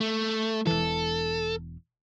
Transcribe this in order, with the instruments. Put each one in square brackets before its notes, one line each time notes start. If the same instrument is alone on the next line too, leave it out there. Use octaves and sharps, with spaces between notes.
[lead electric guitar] A3
[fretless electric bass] E1 E3 [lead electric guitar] A4